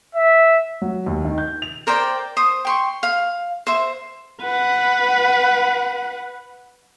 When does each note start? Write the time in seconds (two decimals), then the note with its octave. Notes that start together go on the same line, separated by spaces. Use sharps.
0.15 E5
0.82 F#3
1.06 D#2
1.25 D#3
1.38 G6
1.62 F7
1.87 A#4 C5 D5 G5
2.37 C5 D#6
2.65 G5 C6 C#6
3.03 F5
3.67 C5 E5
4.43 B4 F#5